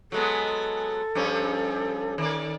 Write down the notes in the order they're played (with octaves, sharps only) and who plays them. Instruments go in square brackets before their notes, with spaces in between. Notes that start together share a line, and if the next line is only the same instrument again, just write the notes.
[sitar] F#3 G#3 B3 [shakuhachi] A4
[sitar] G2 F3 C#4
D#3 D5